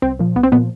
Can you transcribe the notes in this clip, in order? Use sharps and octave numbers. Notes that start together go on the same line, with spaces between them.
C2 C4
A#2 F3
C2 B3
C4
A#2 F3 B3